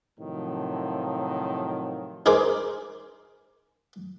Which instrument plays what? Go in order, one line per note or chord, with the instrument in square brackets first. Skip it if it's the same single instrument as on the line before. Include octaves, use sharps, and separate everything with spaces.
[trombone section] A2 C3 D#3 F3 F#3
[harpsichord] D#4 G#4 A#4 C5 D6